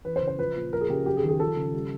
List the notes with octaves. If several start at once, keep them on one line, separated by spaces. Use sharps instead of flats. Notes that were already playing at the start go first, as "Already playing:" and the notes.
E3 B4
C5
C#3
C5
F3 B4
A#2
F3 A#4
G#4
C#3 G4
F#3 G4
G#4
D#3
G#4
F3 A4
C#3
G3